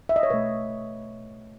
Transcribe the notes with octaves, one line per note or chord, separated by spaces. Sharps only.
E5
D#5
C#5
B2 A3 B4